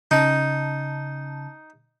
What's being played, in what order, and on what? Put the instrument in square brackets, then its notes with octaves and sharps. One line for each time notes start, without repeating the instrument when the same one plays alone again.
[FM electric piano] C#3 A5 [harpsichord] D#4